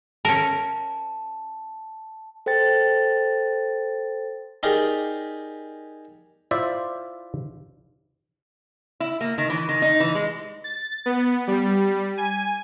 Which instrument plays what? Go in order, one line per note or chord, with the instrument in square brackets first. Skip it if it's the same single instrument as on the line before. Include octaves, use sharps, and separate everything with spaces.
[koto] C#4 A#4 [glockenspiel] A5
[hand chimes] A4 C5 G5 A6
[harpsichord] D#4 G4 G#4 A#4 D5
[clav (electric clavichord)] E4 F4 C5 D5 E5
[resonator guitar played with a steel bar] E4
A#3
D#3
E3
D#3
D#4
E3
G#3
[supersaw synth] A6
B3
G3
G#5